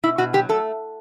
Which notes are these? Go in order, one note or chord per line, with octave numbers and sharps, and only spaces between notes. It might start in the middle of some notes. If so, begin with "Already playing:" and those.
B2 E4
B2 F#4
F#3 G4
A3 A4